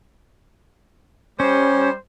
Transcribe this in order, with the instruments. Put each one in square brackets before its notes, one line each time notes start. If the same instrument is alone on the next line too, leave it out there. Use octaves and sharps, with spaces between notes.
[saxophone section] G3 C5 [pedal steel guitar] C#4